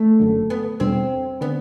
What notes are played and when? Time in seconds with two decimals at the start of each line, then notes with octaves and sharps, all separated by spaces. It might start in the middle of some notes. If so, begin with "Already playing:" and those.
Already playing: A3
0.19 F#1 F#2 D3
0.50 B3
0.80 E2 B2 G3 C4 D4
1.41 D3 B3